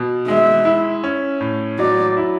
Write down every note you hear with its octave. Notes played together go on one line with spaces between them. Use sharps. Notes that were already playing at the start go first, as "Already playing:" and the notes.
Already playing: B2
G#3 E5
E4
C#4
A2
F#3 D5
E4